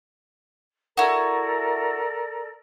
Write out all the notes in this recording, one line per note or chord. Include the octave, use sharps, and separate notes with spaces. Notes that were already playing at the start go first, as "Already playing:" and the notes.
E4 F#4 A4 A#4 D5